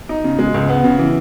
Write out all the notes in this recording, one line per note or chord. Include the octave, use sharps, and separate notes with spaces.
D#4
C#3
G#3
C#2
B3
C#3
E3